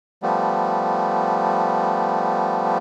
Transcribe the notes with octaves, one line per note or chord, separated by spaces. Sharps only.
F3 G3 A3 B3